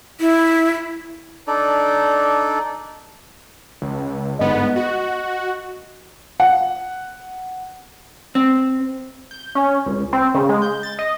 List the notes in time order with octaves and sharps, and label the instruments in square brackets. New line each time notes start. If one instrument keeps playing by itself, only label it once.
[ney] E4
[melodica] D4 D#4 A4 D5
[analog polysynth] C#2
[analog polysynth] G1 G#2 B3 [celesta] D#5
[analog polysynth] F#4
[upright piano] F#5
[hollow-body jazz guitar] C4
[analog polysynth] G6
C#4
C#2
C4
C#3
G#3
G6
A6
D#5